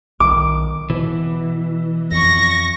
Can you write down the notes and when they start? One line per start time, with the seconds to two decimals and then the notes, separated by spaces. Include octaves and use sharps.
0.20 B1 D#3 D6
0.90 B2 E3
2.12 F2 C#6 A#6